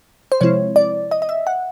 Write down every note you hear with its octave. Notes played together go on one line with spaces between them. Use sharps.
C5
C3 F3 G#3 C4 E4 C#5
D5
D#5
D#5
E5
F#5